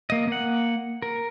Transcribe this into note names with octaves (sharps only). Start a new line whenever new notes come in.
A#3 D#5
A#3 F#5
A#4